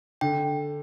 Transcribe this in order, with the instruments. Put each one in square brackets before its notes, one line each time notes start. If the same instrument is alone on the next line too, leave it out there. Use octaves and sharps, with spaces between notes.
[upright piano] D3 [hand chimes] G5